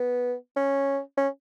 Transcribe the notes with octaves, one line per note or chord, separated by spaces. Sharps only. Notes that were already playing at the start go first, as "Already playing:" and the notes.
Already playing: B3
C#4
C#4